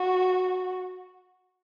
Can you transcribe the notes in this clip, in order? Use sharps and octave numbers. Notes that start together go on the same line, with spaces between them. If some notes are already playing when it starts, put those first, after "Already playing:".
Already playing: F#4